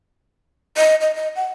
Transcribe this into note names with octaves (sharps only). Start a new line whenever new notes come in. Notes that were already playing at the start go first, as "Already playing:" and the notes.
D#5
D#5
D#5
F#5